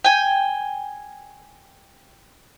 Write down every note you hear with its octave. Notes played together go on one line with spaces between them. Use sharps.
G5 G#5